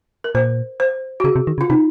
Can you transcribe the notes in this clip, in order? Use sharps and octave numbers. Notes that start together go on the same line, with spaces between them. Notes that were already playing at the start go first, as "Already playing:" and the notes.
A#4
A#2 C5
C5
F#4
C#3 G#4
C3
D#3
C#3
F4
C3 D#4